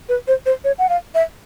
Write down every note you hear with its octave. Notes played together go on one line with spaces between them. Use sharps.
B4
C5
C5
C#5
F#5
F5
E5